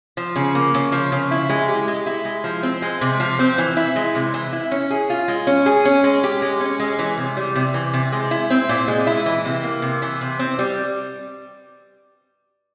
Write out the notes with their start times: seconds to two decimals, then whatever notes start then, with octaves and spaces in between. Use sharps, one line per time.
0.17 F3
0.36 C#3
0.55 A#3
0.74 C#3
0.92 F3
1.12 C#3
1.31 E4
1.49 G#3
1.68 G4
1.88 G#3
2.06 E4
2.25 G#3
2.44 F3
2.63 C4
2.82 G#3
3.01 C3
3.20 F3
3.39 C4
3.58 E3
3.77 E4
3.96 G#3
4.15 C3
4.34 E3
4.53 E4
4.71 C#4
4.91 G#4
5.10 F4
5.28 G#3
5.47 C#4
5.66 G#4
5.85 C#4
6.04 G#3
6.24 G4
6.42 G#3
6.60 C#4
6.80 G#3
6.99 E3
7.18 C3
7.37 G3
7.55 C3
7.74 E3
7.93 C3
8.12 G#3
8.31 E4
8.50 C4
8.69 A#2
8.88 G#3
9.07 E4
9.26 E3
9.45 C3
9.63 A#3
9.82 C3
10.02 E3
10.21 C3
10.39 C4
10.59 G3